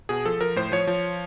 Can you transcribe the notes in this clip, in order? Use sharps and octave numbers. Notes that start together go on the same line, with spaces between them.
B2 G#4
F3 A4
F3 A#4
A2 C5
F3 C#5
F3